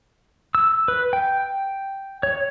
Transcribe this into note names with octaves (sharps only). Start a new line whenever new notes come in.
E6
B4
G5
C#5